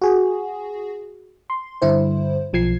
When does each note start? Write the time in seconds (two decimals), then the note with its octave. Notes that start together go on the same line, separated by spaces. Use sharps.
0.01 F#4 G#4
1.50 C6
1.82 G2 D3 E4 C5
2.53 B1 F3 G#6 C7